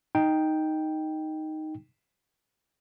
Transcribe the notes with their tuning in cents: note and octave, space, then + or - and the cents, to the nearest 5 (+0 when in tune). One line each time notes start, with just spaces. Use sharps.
D#4 +0 G5 +0